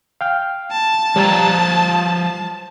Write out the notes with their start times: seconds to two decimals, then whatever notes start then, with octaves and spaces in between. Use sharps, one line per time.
0.21 F5 G5 F6
0.71 A5
1.16 F3 G3 C#5 A#5